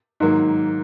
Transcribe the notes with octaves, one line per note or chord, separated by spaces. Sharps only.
G#2 D#3 F#3 A#3